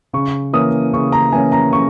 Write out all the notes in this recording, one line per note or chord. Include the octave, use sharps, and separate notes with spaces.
C#3 C#6
E3 A#3 C#4 D#6
C#3 C#6
A#5
E3 A#3 C#4 G#5
A#5
C#3 C#6